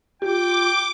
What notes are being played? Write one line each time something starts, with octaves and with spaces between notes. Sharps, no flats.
F4 G4 G5 D6